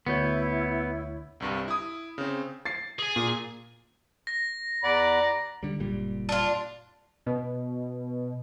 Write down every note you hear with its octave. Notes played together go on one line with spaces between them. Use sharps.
D2 B3 E4 C#5 G6
C2 G2 C3
E4 D#6
C#3 C4
A6 C7
G#4 G#5
A#2
A#6
E2 D5 F#5 A#5 B5
D3 G3
F#1 A#2 G3
D4 F4
B2